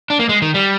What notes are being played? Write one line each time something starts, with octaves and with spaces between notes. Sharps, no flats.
D4
A#3
G#3
D#3
G3